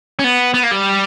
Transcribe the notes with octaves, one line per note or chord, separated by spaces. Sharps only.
C#4
B3
B3
A#3
G3